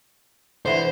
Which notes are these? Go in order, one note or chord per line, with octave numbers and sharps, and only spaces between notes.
D3 E3 C5 C#5